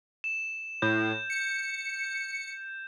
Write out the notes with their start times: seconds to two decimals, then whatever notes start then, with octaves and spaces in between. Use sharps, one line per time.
0.24 E7
0.82 A2 G6
1.30 C#7